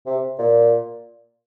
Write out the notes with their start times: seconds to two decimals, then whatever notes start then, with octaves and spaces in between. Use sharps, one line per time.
0.06 C3
0.39 A#2